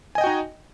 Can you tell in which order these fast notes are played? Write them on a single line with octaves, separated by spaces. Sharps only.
G#5 D#5 G5 F#4 D#4